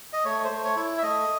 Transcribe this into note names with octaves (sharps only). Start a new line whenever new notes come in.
D#5
A3 C#5
C5
A3
C#5
E4
E5
A3 D#5